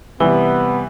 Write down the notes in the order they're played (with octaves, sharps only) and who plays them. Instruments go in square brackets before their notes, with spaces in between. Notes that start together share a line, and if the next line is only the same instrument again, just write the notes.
[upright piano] C3 G3 G7 [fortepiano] E3 [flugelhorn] B3